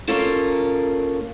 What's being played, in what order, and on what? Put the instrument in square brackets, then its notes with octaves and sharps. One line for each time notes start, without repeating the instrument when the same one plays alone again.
[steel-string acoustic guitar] A#3 C#4 F4 A4 A#4